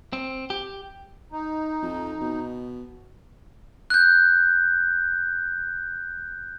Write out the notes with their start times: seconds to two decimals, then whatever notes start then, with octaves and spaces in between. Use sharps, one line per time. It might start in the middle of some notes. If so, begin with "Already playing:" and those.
0.13 C4
0.50 G4
1.32 D#4
1.82 F2
2.21 B2
3.90 F#6 G6